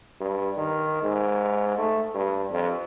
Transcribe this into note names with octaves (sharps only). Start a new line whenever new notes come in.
G2
D#3
G#2
A3
G2
F2